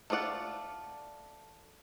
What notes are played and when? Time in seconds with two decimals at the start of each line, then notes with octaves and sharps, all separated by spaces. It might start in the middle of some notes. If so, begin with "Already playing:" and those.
0.10 A3 D4 F4 D5 F#5